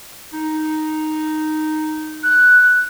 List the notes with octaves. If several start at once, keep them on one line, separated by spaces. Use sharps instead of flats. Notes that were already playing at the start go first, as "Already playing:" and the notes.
D#4
F#6